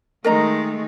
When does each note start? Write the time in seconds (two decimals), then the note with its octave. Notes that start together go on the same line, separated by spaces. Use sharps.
0.24 D#3 G#3 A3 A#4 D#5 A#5